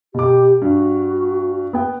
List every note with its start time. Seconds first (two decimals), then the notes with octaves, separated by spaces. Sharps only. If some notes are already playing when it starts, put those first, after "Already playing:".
0.14 B2 G4 D6
0.62 G2 F#4
1.73 B3 G5